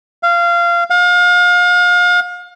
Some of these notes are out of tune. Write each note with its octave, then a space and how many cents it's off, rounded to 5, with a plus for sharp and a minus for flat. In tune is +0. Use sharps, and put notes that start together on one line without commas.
F5 -20
F5 +35